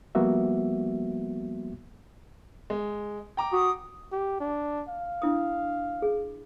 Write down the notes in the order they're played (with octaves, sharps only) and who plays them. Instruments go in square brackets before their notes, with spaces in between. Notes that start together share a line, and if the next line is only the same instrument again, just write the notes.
[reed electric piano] F3 G3 A#3 B3 F#4 E5
[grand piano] G#3
G5 A#5 D6
[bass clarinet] F#4 [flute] D#6
[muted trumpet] G4
D4
F5
[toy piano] D4 E4 D#6
G#4